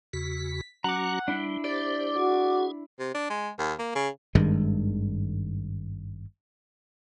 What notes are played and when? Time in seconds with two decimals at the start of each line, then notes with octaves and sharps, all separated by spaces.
0.13 E2 C#3 F#4 B6
0.84 F#3 C#4 F#4 F#5 A#5 D6
1.28 G3 D4 E4 E5
1.64 G4 C5 D5
2.18 F#4 G#4
2.99 C3
3.14 D4
3.30 G#3
3.59 D#2
3.79 A#3
3.95 C#3
4.35 G#1 G2 D#3 G#3